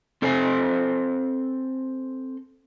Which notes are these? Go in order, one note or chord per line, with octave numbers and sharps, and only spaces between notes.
C4 A4 C5 G#5